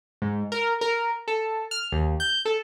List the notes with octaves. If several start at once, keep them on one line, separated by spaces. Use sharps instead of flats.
G#2
A#4
A#4
A4
F6
D#2
G6
A4